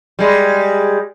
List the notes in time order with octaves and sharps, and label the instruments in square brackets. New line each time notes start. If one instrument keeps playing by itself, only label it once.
[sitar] G3 G#3